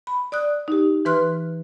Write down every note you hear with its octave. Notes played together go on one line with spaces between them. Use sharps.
B5
D5 D#6 F#6
D#4 G4
E3 B4 C6 F6 F#6